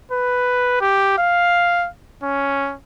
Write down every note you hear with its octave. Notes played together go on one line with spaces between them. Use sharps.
B4
G4
F5
C#4